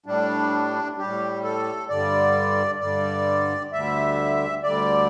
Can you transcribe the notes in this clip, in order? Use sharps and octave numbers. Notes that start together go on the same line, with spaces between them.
A2 G3 D4
A2 G3 G4
A4
G2 D3 G3 D5
G2 D3 G3 D5
D2 D3 G3 E5
D2 D3 G3 D5